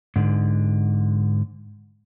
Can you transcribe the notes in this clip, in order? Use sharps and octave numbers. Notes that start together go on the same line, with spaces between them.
G#2 D3